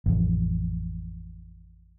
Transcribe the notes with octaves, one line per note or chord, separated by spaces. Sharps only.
A1 F2